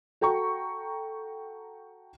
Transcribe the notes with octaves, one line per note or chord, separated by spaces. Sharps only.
F#4 A4 G5 A#5 C#6